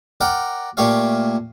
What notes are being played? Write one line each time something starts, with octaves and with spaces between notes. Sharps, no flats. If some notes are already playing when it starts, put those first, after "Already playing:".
A#4 D5 F#5 G5
A#2 A3 G4 C#5 F5